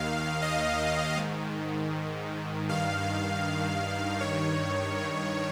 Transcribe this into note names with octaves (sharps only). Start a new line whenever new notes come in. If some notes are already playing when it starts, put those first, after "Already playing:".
Already playing: D#2 D#3 F5
D#5
G#2 D#3
G2 D#3 F5
G2 D#3 C#5